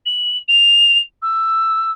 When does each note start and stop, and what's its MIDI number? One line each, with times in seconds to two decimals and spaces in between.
0.06 0.37 102
0.48 1.00 101
1.22 1.91 88